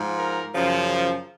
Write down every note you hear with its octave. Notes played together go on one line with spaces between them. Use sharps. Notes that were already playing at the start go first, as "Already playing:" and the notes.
Already playing: G#2 F3
A#4
F#2 C#3 F3